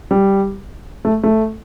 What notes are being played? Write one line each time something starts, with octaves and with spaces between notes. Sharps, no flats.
G3
A3
A3